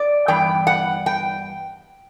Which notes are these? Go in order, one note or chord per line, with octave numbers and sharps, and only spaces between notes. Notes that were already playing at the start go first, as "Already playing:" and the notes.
Already playing: D5
G2 E3 B3 G5
F#5
G5